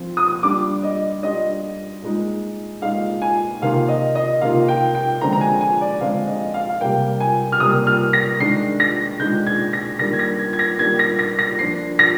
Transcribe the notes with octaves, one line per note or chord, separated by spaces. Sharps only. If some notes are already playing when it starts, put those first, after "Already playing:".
Already playing: F3 C4 F4
D#6
G3 D4 F4 D6
D#5
G3 D4 F4 D#5
A#2 G#3 D#4
A#2 G#3 D#4 F5
G#5
C3 D#3 A#3 F4 F5
D#5
D#5
C3 D#3 A#3 F4 F5
G5
G5
D3 F3 G#3 C4 A#5
A#5
G#5
G#5
D5
D3 F3 G#3 C4 F5
D#5
F5
F5
C3 G3 A#3 G5
G#5
F6
C3 G3 A#3 D#6
F6
A#6
D#3 G#3 D4 C7
A#6
D#3 G#3 D4 G6
G#6
A#6
D#3 G3 A#3 D4 A#6
G#6
A#6
G#6
G#6
A#6
D#3 G3 A#3 D4 G#6
A#6
A#6
A#6
A#2 F3 A#3 D4 C7
A#6